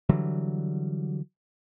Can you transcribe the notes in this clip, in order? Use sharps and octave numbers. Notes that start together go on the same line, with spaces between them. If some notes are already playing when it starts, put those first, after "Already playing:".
D3 E3 F#3 G3